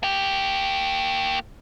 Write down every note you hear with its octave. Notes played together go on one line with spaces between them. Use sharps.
A#3 G4